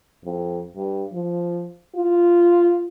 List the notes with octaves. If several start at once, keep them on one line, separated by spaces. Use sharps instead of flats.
F2
G2
F3
F4